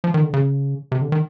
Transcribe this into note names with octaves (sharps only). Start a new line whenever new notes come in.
F3
D#3
D3
C#3
C3
D3
D#3